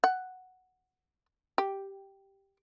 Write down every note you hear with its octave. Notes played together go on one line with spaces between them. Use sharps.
F#5
G4